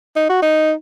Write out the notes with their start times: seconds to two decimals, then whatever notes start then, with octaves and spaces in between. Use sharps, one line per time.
0.16 D#4
0.29 F#4
0.42 D#4